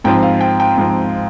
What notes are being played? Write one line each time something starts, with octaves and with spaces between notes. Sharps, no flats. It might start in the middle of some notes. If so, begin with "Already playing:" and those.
G#2 F3 C4 G5
F5
G5
G5
G#2 F3 C4